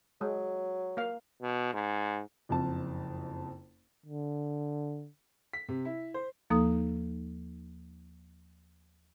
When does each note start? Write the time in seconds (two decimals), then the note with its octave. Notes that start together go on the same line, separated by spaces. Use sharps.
0.21 F#3 G#3
0.97 A#3 F5
1.42 B2
1.73 G#2
2.49 F#1 F2 A5
4.06 D3
5.53 B6
5.69 C3
5.85 E4
6.14 C5
6.50 D#2 F3 A#3 D#4 A4 D#6